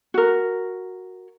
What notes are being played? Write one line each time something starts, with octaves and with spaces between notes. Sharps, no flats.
F#4 A#4